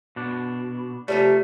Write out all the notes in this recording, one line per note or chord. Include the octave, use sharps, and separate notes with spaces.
B2 D4
C3 F3 G3 A3